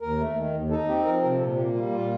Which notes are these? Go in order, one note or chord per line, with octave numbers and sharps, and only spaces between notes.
D#2 A#4
A3
D#3
D#2
D#4 A4
C4 G4
F3 A#4
C3 A#4
A#2 A4
A#3 G4
G3 F4
A#2 F4